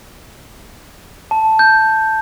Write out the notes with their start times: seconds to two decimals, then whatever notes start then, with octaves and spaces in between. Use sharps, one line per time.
1.31 A5
1.59 G6